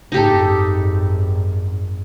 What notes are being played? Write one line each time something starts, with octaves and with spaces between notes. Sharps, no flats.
G#1 F#2 D#4 G4 A4